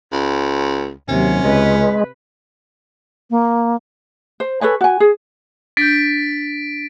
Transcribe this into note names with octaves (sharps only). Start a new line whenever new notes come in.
C#2
D#2 C3 F#3 C#4
C#2 G#3 B4
A#3
C5
A4 B4 C#5 G#5
F#4 G#5
G#4
D4 G6 A6 B6 D7